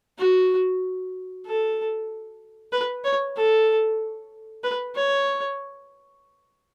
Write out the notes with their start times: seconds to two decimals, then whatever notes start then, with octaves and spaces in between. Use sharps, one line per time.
0.18 F#4
1.45 A4
2.73 B4
3.04 C#5
3.37 A4
4.64 B4
4.95 C#5